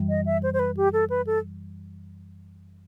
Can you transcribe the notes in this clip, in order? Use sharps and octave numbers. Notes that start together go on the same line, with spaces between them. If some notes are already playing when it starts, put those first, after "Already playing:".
Already playing: F#2 E3 G3
D#5
E5
C5
C5
B4
G4
A4
B4
A4